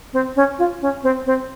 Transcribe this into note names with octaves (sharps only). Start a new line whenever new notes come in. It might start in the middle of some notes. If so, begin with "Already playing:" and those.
C4
C#4
F4
C#4
C4
C4